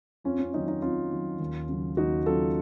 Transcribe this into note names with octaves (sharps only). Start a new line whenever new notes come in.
F2 C#4 F4
C#4
D#3 F#3 D#4
D#4
F2 C#4 F4
D#3 F#3
D#2
C#3 F#3
D#2 D#4 F#4
C#3 F#3 F4 A4